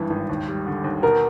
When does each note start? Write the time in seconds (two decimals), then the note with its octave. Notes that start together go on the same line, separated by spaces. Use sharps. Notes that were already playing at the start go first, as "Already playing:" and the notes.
Already playing: G#1 G2 E3
0.10 G#1
0.29 D#2
0.48 G3
0.67 D3
0.84 D#2
1.03 B2 A#4